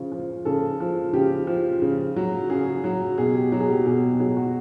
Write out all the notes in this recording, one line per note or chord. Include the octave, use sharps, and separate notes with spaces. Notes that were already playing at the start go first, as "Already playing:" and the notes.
Already playing: C#3 F3
F3
C#3 A4
F3
C#3 G4
F3
C#3
F#3
C#3 G#4
F#3
B2 G#4
G4
F#3
G#4
G4
B2 G#4
F#3 G#4
F#4